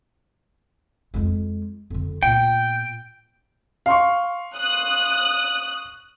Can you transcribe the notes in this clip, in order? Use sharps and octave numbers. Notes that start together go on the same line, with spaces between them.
F2 G#3
F2 D3
A#2 B3 G5
F5 C6 C#6
D#6 F#6